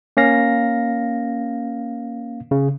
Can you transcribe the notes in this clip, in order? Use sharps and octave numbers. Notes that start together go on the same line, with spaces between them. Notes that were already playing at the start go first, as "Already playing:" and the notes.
A#3 C#4 F5 A#6
C#3